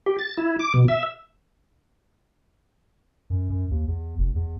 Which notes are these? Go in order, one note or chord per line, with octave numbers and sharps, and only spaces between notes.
G4
A6
E4
D6
B2
E5
F#2
F#2
D#2
E2
F1
E2